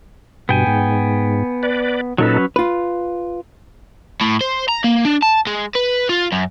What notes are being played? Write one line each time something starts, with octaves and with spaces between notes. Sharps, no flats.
G2 B2 B3 G5 G#5
G#2
B4 D5
A#2 F#3 C#4 D#4 A4 B4
F4 B4
A2
C5
A#5
A#3
D4
A5
G#3
B4
F4
F#2